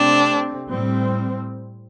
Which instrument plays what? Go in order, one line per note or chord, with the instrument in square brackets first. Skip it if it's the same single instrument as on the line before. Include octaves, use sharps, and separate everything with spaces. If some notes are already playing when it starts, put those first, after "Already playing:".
Already playing: [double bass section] C3 A3 C4 [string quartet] D4
[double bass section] A2 G3 C4